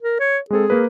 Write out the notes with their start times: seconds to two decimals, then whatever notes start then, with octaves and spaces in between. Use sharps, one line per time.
0.02 A#4
0.20 C#5
0.50 G#3 C4 G#4 A4
0.70 A#3 A#4 B4